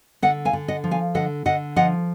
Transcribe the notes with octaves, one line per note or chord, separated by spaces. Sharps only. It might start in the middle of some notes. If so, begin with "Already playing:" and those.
D3 D#5 F#5
F5 G#5
D3
D#5 F#5
F3
F5 G#5
D3 D#5 F#5
D3 D#5 F#5
F3 D#5 F#5